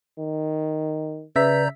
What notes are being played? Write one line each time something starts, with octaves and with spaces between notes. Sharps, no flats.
D#3
C#3 B4 D5 E5 A#5 G6 B6